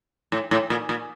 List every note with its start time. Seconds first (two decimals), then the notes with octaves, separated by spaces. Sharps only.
0.32 A2
0.51 A2
0.70 A#2
0.89 A#2